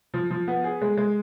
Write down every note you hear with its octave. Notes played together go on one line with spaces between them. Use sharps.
F3
F3
B3
G#4
G#3
G#3